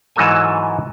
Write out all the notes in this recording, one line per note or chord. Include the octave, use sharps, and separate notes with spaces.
G#2 E3 F#3 A#3 A4 G#5